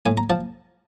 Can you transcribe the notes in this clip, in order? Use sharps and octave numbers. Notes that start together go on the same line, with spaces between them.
A2 G#5
A#5
F3 A5